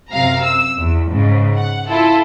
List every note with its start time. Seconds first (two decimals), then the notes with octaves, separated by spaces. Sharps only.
0.11 F#2 C3 F5 A#5
0.42 E6
0.78 E2
1.10 G#2 C#3
1.57 F#5
1.88 E4 F4 A4